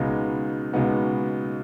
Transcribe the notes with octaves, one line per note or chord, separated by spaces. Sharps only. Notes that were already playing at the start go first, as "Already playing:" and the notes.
Already playing: C#2 B2 G#3 B3 D#4
C#2 B2 G#3 B3 D#4